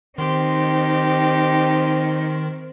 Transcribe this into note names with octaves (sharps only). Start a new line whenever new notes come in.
D#3 C4 D#4 G4 C6